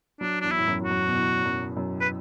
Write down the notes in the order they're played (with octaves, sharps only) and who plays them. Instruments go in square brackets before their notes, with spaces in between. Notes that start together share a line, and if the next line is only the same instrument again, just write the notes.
[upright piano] F#3 [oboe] D4
[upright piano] E2 [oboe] D4
[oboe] E4
[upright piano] A2
F#2
[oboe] F#4
[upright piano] F#2
B2
A2
F#2
F#2
[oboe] B4